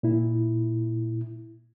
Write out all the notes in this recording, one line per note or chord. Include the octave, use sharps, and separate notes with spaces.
A#2 E4